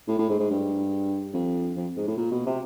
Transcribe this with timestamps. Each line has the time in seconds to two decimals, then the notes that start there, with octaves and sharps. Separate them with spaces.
0.08 A2
0.19 A2
0.29 G#2
0.39 G#2
0.50 G2
1.34 F2
1.77 F2
1.97 G#2
2.08 A2
2.17 A#2
2.32 B2
2.46 C3